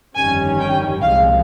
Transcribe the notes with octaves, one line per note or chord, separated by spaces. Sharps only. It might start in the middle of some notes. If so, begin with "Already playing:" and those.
G1 F2 D#3 G3 C#4 G#5
G5
C2 A#2 F3 G#3 F5